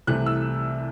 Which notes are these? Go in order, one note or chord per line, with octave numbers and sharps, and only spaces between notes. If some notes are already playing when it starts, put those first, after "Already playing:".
C2 C3 E3 A3 F#6
E6